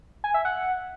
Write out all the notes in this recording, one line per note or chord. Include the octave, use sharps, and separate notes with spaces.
G#5
E5
F#5